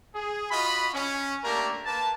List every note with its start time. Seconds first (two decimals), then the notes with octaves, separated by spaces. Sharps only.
0.15 G#4
0.51 F4 F#4 D#5 B5
0.93 C#4
1.44 A3 A#3 D4 G4 A#4
1.85 A#3 B4 A5